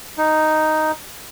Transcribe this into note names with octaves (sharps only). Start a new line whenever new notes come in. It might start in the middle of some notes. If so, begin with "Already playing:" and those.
D#4